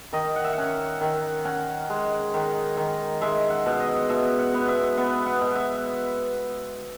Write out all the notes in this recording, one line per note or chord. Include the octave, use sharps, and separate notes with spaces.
D#3 D#5
F#5
E5
C#4 F#5
D#3
C#4 F#5
G#3
D#3
D#3
G#3 E5
F#5
B2
D#5
B2 E5
F#5
B3
E5
B3 F#5
F#5
B2
E5